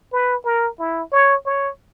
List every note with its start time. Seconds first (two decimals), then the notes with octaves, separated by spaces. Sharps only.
0.13 B4
0.45 A#4
0.79 E4
1.12 C#5
1.46 C#5